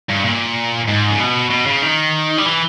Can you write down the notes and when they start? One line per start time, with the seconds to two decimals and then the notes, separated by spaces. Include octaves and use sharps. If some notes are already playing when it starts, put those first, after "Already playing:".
0.09 G2
0.25 A#2
0.88 G#2
1.10 C#3
1.20 B2
1.50 B2
1.66 C#3
1.83 D#3
2.38 G3
2.46 E3